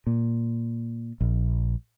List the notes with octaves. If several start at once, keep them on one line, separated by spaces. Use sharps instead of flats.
A#2
A#1